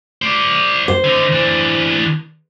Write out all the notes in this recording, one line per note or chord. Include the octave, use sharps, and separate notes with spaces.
C5 D5
C5
D3 D#4
E3 D4